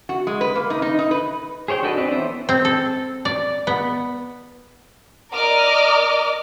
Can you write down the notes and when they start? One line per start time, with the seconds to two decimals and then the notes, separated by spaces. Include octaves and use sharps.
0.09 F#4
0.27 G#3
0.41 B4
0.55 A#3
0.70 D#4
0.82 D#4
0.99 D#4
1.11 B4
1.68 G#4 C5 C#5 G5
1.83 D4 F#4 A4 B4 D#5
1.98 C4 D4 B4
2.11 E3 B3 C#4 C5 E5
2.49 C4
2.65 A4
3.25 D5
3.67 B3
5.33 A#4 D5 D#5 D6 F6